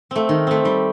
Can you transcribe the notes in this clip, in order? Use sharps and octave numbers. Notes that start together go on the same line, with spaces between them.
A3 C4
D#3
A3 C4
G3